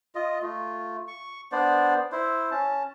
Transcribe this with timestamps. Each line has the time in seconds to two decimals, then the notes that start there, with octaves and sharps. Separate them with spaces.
0.15 F4 D#5
0.42 A3 F4
1.08 C#6
1.52 B3 D4 C5 D5
2.12 E4 C5
2.51 C#4 A5